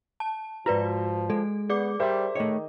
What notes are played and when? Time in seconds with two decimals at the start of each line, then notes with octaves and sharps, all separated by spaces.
0.20 A5
0.66 G#2 F3 F#4 B4 D5 A#5
1.30 G#3 A4
1.69 B3 G#4 D5 D6
2.00 G3 A#4 C5 E5
2.35 D#3 A3 C#5 D#5